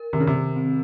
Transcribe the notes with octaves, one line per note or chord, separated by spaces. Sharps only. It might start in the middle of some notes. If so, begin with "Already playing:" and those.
Already playing: A#4
C3 D#3
C#3
C3
D#3
C4